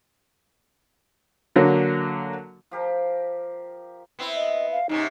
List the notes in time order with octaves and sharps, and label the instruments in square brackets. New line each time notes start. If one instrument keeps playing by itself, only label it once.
[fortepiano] D3 F#3 A#3
[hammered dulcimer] F3 G4 A#4
[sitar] B3 C4 E4
[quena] D#5
F5
[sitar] G#2 C3 C#4 [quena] D#4